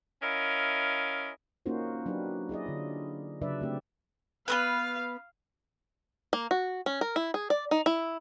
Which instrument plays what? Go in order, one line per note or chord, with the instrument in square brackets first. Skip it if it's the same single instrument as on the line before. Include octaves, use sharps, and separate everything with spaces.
[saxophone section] C#4 E4 A#4 D#5 F5
[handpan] A#3 C#4 D#4 F4 F#4 C5
F#3 D4 D#4 G4 B4
E4 G#4 D5 D#5
D3 F4
C#3 F#3 D4 B4 D5 E5
A3 C4 G4
[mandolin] B3 C4 B4 [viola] F5
[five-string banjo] A#3
F#4
C#4
A#4
E4
G#4
D5
D#4
E4